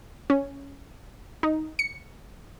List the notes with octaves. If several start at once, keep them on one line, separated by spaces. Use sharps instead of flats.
C#4
D#4
C#7